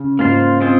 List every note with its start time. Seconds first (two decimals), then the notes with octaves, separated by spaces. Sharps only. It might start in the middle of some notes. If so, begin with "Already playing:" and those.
Already playing: C#3
0.19 G#2 A#3 F4 C5
0.61 G#3 C4 F4 G#4 C5